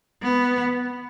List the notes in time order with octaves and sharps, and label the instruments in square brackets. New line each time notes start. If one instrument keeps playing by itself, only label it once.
[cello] B3